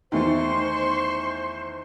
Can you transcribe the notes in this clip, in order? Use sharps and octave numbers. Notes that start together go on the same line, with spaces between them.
E2 D#3 A3 C5 C6 C#6